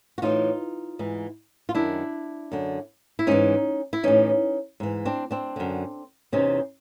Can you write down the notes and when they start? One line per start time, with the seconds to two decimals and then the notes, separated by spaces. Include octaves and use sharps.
0.18 F#4
0.22 A2 E3 D#4 F4
0.99 G#2 E3
1.69 F4
1.74 F#2 D#3 D4 E4
2.52 F#2 D3
3.19 E4
3.27 G#2 E3 C#4 D#4
3.93 E4
4.03 A2 E3 C#4 D#4
4.80 G#2 E3
5.05 C4 D4
5.31 C4 D4
5.56 F#2 D3
6.32 E2 C3 E3 C#4 D#4